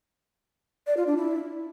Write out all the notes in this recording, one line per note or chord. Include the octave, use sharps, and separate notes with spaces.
D5
F4
D4
E4